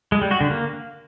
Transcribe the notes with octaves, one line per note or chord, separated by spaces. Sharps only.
G#3
G3
F#4
D3
A#3